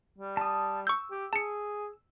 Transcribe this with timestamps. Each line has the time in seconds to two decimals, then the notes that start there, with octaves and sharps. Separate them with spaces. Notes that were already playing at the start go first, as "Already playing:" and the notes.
0.19 G3
0.37 A5 D#6
0.87 C#6 E6 G6
1.11 G4
1.33 G#4 A5 C#7